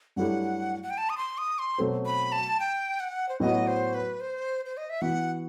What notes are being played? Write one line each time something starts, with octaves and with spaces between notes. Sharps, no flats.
G2 F#3 A3 E4 G4 F#5
F#5
G5
A5
D#6
C6
D#6
C6
B2 F#3 A3 C4
B5
A5
G5
F#5
C5
A2 F#3 B3 F#4 D#5
C5
B4
C5
C5
D#5
E5
E3 B3 F#4 F#5